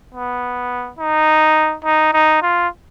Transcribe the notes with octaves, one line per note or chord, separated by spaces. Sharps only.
B3
D#4
D#4
D#4
F4